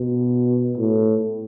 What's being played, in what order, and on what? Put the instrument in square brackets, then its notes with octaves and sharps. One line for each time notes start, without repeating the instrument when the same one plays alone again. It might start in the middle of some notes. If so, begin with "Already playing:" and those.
Already playing: [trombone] B2
A2